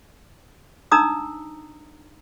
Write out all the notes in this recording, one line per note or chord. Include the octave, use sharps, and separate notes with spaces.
D4 D#4 A#5 D#6 E6